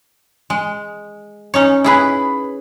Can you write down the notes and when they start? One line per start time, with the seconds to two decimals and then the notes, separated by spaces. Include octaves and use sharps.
0.50 G#3
1.54 C#4 D#4 C#5
1.84 E4 G#4 B4 C#5 B5